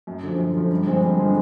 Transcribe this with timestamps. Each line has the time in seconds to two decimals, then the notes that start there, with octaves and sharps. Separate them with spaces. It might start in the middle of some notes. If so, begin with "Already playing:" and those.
0.07 F#2
0.23 D3 F3
0.38 F#2
0.55 D3 F3
0.71 G2
0.87 D3 F3 G#3 C4
1.03 G2
1.19 D3 F3 G#3 C4